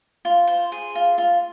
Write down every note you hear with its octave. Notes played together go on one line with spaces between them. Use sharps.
F4
C5
G#4
F4
F4